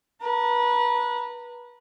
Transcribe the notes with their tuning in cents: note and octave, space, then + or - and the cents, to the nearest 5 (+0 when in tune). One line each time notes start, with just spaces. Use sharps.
B4 -30 A#5 -35